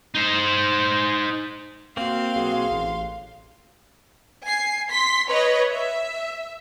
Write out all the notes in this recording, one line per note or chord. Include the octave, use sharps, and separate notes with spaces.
D#4 C5
A#3 C4 F#4 F5 C6 C7
B1 F#4 G#4
A1
G#5 C7
C6 B6
B4 C#5 D#5
E5